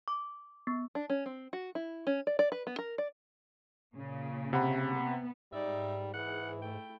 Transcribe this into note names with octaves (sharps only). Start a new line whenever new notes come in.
D6
B3
D4
C#4
C4
F#4
E4
C#4
D5
D5
B4
B3
A#4
D5
A#2 C#3
C3 F#5 B5
B3
G#2 G3 D#4 D5 E5
E3 G#4 F#5
A3 E4 G5